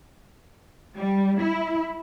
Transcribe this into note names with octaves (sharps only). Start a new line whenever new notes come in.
G3
E4